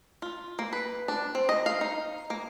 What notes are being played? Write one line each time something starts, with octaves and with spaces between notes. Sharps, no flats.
F4
A#3
B4
D4
C4
D#5
F5
D#4
A#3